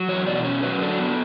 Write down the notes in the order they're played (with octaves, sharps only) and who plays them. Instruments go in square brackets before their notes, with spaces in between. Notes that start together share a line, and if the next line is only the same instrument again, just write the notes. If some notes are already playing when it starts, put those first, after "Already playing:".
Already playing: [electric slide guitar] F#3
E2 C#5
B2 D5
C#4 C#5
F#3 B4
D4 A4
B3